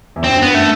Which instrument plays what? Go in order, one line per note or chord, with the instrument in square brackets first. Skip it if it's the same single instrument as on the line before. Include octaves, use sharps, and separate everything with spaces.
[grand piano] E2
[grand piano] F#2 [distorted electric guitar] C4
[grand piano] G2
[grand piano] F#2 [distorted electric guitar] B3
[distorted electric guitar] A3